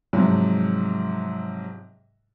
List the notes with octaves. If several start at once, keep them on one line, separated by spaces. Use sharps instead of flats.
G#2 C3 F3 F#3